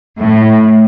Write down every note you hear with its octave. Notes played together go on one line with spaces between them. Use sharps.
A2